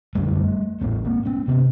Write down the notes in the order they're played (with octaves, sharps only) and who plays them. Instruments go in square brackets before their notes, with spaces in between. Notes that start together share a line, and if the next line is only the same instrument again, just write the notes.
[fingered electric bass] F#1 F#2 D3 G3 A3
A1 A2 A3 B3
A#3 C4
B3 C#4
C3 B3 C#4